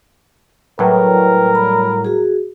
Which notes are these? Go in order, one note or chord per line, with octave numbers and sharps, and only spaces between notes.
A2 F#3 G3 A#4 B4 G5
B5
F#4 G#4